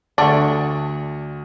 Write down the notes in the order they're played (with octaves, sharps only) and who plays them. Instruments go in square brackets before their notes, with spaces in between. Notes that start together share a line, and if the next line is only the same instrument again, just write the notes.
[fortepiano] D2 F#5 C#6 [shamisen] A3 D4